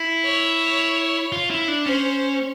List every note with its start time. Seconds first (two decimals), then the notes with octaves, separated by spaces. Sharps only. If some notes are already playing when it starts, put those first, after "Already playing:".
Already playing: E4
0.24 C#5
1.32 F4
1.50 E4
1.68 D4
1.86 C#4 C5